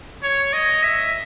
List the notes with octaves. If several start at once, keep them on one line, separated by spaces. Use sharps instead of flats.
C#5
D#5
E5